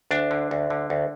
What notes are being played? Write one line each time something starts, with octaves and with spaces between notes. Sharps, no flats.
D2 D4
D3
D2
D3
D2